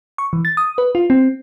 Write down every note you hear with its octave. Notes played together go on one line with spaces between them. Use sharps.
C#6
E3
A6
D#6
B4
F4
C4